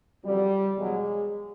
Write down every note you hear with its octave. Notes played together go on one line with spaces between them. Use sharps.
F2 C#3 F#3 G3
E2 B2 F#3 G#3